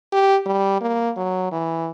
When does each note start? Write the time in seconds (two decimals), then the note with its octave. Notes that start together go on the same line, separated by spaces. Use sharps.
0.13 G4
0.46 G3
0.81 A#3
1.17 F#3
1.52 E3